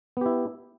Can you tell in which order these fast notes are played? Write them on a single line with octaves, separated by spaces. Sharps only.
B3 G4 E4